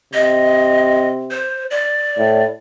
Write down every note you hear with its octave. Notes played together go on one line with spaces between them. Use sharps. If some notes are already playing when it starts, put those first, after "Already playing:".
C3 D#5
C5
D5
A2